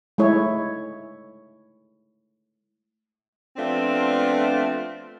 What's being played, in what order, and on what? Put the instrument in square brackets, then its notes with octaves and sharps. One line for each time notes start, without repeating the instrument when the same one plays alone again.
[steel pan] G#3 A3 E4 C#5
[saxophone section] F3 A3 B3 C4 D4 F4